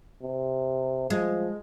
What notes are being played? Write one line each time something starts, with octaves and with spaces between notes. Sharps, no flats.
C3
F3 G#3